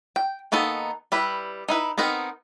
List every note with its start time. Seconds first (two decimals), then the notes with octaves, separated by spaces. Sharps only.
0.16 G5
0.52 D#3 A#3 B3 D#4 A4
1.12 G3 E4 B4
1.68 D#4 E4 B4
1.98 B3 C4 D#4 A#4 F#5